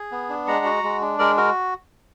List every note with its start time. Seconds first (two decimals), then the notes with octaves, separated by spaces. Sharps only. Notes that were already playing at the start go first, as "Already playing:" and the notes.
Already playing: G#4
0.12 B3
0.29 D4
0.47 G#3 F#5 A#5
0.65 F#4
0.83 G#3
1.01 D4
1.19 G#3 A#4 D5
1.37 F#4 A#4